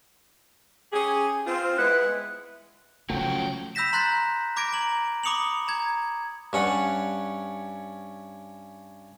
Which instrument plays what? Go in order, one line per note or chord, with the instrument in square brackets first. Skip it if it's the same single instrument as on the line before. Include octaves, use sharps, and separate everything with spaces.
[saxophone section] C#4 G4 G#4
C4 F4
[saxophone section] G#3 B3 E4 [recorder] F#6
[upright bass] C#3 [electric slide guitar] F3 F#3 F#4 [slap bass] A3 [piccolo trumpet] G5
[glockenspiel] B5 E6 G6 A#6 B6 E7
A#5 C6 F#6 G6 A6 B6
B5 D6 G#6 A#6 D7
A#5 F#7
B5 D6 D#6 C#7 F7 F#7
A#5 G#6
[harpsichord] G2 C#4 F#5